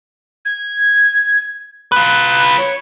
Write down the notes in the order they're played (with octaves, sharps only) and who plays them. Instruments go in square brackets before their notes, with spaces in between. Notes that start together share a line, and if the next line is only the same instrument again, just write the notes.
[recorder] G#6
[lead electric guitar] F4 B4 [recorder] F#6
[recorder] C#5